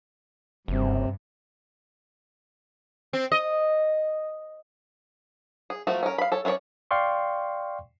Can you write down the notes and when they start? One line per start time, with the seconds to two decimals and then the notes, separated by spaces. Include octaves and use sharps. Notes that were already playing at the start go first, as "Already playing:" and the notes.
0.68 F#1 G2 C3
3.13 C4
3.32 D#5
5.70 G#4
5.87 F3 A3 A#3 F#4
6.03 C#4 A#4
6.18 F5 B5
6.32 A4 C#5
6.45 C#4 E4 F4 C#5 D5
6.91 D5 F5 G5 C6 C#6